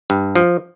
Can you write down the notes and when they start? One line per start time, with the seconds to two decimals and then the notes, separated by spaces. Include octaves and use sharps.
0.10 G2
0.35 F3